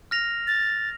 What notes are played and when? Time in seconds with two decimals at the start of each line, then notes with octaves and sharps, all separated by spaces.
0.11 F6 A#6 F7
0.47 A6